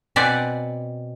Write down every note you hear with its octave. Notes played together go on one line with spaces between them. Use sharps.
B2 C4 B4 D5 F#5 G#5